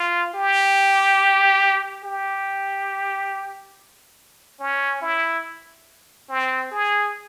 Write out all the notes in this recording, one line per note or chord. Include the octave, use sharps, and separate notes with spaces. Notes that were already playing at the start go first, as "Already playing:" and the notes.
Already playing: F4
G4
G4
C#4
E4
C4
G#4